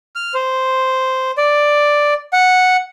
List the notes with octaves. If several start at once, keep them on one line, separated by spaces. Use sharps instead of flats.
F6
C5
D5
F#5